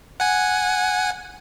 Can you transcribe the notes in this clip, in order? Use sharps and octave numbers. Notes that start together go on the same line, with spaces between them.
F#5 G#5